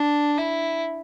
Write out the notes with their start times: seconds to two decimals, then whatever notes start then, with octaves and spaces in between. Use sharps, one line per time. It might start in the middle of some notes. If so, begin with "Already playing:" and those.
Already playing: D4
0.38 E4